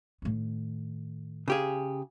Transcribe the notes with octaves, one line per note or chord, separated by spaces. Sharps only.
A2 D#3
C#3 G4 G#4